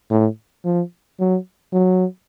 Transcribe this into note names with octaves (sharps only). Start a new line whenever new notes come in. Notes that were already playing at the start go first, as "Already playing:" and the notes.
A2
F3
F#3
F#3